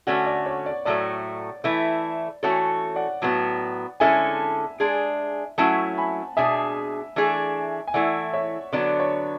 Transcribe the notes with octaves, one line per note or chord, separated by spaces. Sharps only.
D3 A3 C#4 F#4 D5 F#5
D5
C#5
D5
A2 F#3 A3 D5
E3 A3 E4
E3 A3 C#4 F#4 A4 C#5
D5 F#5
A2 F#3 B3
D3 G#3 C#4 E4 A4 E5 G#5
G#3 D4 G#4
F#3 A3 C#4 E4 F#5 A5
G#5 B5
B2 G#3 D4 G#4 E5 G#5
E3 A3 D4 G#4
G#5
E3 A3 E4 D5 F#5
C#5 E5
D3 F#3 B3 D4 D5
C#5